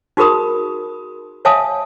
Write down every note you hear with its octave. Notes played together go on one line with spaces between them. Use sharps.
D#4 F#4 G#4 A#4 B5 D#6
C#5 E5 F5 G#5 A5 D#6